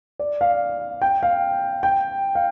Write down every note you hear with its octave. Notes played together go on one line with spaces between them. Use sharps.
D5
F5
G5
F5
G5
F5